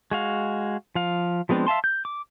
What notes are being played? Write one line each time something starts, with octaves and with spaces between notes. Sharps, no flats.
G#3 F#4 F5
F3 F5
F3 G#3 B3 C4 D4
E5 F5 A5 C6
G6
D6